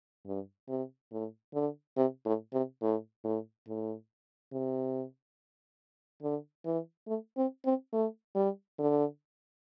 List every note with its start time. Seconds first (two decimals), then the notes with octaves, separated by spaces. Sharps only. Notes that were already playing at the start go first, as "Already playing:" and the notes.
0.26 G2
0.69 C3
1.12 A2
1.54 D3
1.97 C3
2.25 A2
2.53 C3
2.82 A2
3.24 A2
3.68 A2
4.52 C3
6.22 D3
6.65 E3
7.07 A3
7.37 C4
7.65 C4
7.93 A3
8.35 G3
8.79 D3